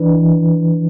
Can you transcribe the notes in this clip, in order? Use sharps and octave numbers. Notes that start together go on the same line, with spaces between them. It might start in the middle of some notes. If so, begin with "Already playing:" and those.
Already playing: E3 D4 B4
E3